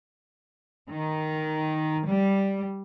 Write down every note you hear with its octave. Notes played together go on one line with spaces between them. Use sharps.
D#3
G3